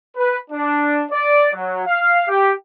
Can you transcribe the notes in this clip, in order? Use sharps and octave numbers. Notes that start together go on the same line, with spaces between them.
B4
D4
D5
F#3
F5
G4